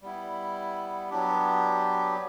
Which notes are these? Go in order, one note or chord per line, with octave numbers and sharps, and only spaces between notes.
G3 B3 E4
F#3 B3 D4 G4